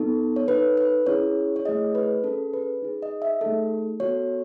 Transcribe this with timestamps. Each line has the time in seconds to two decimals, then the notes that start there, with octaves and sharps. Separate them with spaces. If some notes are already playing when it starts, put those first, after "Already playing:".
Already playing: B3 D#4 A4
0.36 C#5
0.47 D#4 A4 B4
0.77 B4
1.06 C#4 E4 G#4 C#5
1.56 C#5
1.65 A3 E4 G#4 D#5
1.95 B4
2.24 C#4 G#4 A4
2.53 B4
2.82 D#4 G#4
3.02 D#5
3.22 E5
3.41 A3 D#4 G#4 A4
4.00 B3 F#4 A4 C#5